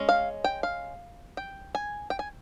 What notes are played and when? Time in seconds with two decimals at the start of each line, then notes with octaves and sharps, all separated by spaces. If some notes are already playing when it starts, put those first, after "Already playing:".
Already playing: G#3 C#4
0.09 F5
0.44 G5
0.63 F5
1.37 G5
1.75 G#5
2.10 G5
2.19 G#5